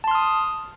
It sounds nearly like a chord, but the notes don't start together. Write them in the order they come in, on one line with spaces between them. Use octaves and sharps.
A5 C6 F6 D#6